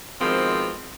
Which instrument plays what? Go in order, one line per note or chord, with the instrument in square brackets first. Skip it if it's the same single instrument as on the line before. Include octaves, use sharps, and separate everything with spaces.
[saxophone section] B2 D#3 F3 G#3 C4